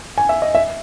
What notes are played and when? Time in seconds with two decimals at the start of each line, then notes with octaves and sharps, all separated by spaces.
0.18 G#5
0.29 E5
0.42 D#5
0.55 E5